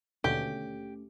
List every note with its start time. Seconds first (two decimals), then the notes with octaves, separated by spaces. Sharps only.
0.24 D#2 B2 D3 A3 C#4 G4